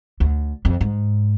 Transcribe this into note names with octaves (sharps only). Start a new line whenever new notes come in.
D2
F2
G#2